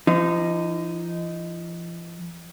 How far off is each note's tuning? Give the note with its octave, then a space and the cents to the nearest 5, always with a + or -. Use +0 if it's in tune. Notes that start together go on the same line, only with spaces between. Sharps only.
F3 -45 D#4 +0